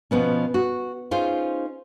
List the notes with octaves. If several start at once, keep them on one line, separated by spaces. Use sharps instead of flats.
B2 F3 B3 C#4
F#4
C#4 D#4 F4 G#4 C5